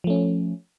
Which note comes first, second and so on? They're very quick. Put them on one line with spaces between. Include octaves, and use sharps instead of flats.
F3 A3 C#4